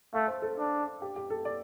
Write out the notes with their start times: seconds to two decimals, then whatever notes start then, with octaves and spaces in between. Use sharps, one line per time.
0.14 A3 F5
0.27 C5
0.42 A4
0.58 D4
1.02 G4
1.16 G4
1.30 A4
1.45 D5